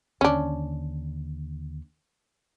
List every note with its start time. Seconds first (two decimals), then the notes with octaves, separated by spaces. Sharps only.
0.21 D#2 D3 C#4 D4